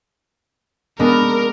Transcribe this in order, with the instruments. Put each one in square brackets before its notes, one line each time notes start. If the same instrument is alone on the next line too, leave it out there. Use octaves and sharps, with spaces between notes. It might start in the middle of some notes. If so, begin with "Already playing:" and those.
[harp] G#3 B3 D4 [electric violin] A#4